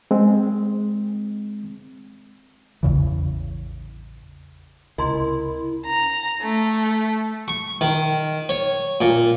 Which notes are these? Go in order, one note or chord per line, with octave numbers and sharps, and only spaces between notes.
G#3 C4
A1 E2 C#3 E3
C#2 C3 E4 A#4 D#5 A#5 C6
A#5
A3
C#6
D#3
C#5
A#2